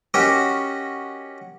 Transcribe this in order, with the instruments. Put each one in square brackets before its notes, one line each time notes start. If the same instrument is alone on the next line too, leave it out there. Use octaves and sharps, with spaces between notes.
[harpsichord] C#4 F#4 G4 A#4 D#5